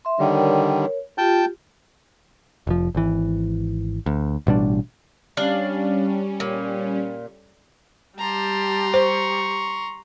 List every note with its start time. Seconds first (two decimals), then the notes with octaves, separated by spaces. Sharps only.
0.05 E5 C6
0.19 D3 D#3 G3 A#4 C#5
1.18 F4 G4 G5 A5 G6
2.67 F1 F3
2.95 G#1 E3
4.06 D2
4.47 A1 B2 G3 D4
5.37 G3 C#4 D4 F5
6.40 A#2
8.19 G3 G4 A5 A#5 C6
8.94 C5 C#6